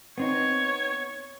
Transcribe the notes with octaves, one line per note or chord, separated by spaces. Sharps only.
B3 C4 D#4 C#5